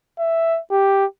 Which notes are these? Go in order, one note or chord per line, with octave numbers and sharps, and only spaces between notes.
E5
G4